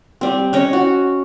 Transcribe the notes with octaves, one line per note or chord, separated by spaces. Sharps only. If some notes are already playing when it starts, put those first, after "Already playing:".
G3 C4
C#4 C#5 D#5
F#4